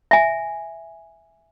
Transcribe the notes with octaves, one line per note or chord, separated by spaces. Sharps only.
E5 G#5